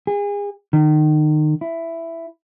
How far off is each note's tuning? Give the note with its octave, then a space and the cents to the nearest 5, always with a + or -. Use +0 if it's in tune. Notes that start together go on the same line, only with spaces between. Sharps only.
G#4 -35
D#3 -30
E4 +10